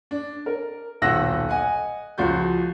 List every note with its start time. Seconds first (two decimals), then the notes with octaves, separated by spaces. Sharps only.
0.11 D4
0.46 A#4
1.02 D#1 B1 F#5 E6 F#6 A#6
1.49 D#5 F#5 G#5
2.18 C#2 F3 F#4 G6